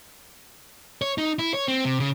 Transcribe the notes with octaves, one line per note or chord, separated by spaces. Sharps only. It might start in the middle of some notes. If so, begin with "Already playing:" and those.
C#5
D#4
E4
C#5
C4
C3
C#3